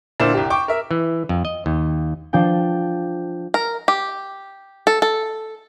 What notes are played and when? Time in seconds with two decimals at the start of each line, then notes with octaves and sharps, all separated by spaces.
0.20 A#2 D3 E4 C5 E7
0.34 C2 G4
0.50 G5 C#6 D6
0.68 A#4 E5
0.91 E3
1.29 F2
1.45 D#5
1.66 D#2
2.33 F3 D4 G5
3.54 A#4
3.88 G4
4.87 A4
5.02 A4